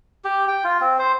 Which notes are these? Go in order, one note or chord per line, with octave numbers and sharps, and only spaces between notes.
G4
G5
F4
C4
C5